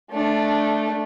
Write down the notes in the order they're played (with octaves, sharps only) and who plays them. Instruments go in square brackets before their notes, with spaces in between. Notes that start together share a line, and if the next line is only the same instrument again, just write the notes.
[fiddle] A3 D4